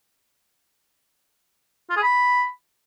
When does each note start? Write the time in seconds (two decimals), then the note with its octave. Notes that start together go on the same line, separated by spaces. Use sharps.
1.90 F4
1.96 G#4
2.03 B5